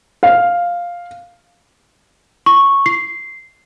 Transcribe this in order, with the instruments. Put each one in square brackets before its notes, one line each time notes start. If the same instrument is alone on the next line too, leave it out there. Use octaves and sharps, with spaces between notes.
[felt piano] F5
[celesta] C#6
C7